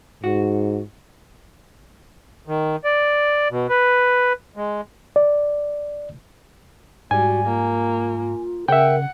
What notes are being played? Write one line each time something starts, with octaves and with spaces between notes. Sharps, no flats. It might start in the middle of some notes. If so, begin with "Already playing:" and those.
G#2 F#4
D#3
D5
B2
B4
G#3
D5
G#2 G3 F#4 G#5
A#3 F4
C#3 A#4 E5 F#5 G5